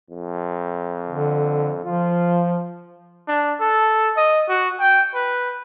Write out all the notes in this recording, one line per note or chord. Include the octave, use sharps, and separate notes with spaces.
F2
D3
F3 F4
D4
A4
D#5
F#4
G5
B4